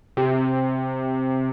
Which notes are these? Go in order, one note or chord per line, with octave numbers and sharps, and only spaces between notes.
C3